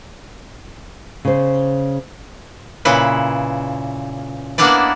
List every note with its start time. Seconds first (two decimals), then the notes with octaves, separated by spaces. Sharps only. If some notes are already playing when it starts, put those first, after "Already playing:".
1.25 C#3 C5
2.85 A#2 C#3 E4 B4
4.58 A#3 B3 D4 E4 B4 D5